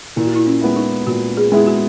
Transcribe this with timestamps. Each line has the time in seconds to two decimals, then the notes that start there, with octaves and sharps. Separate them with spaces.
0.16 A#2 E4
0.26 F#4
0.36 E4
0.47 C#4
0.61 G#3 B3 E4
0.76 D#4
1.07 A#2 F#4
1.37 G#4
1.52 G#3 B3 E4 G#4
1.67 F#4